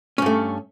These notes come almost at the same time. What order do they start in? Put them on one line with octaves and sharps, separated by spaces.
C#4 G2 A3